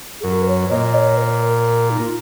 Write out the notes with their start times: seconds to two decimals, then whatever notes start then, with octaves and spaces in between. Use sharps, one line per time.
0.20 G#4
0.24 F#2 A#4
0.42 B4
0.47 C#5
0.71 A#2 D#5
0.94 C#5
1.18 A#4
1.90 D#4
2.01 F4